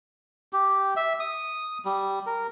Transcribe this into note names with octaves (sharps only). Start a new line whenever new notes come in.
G4
E5
D#6
G3
A#4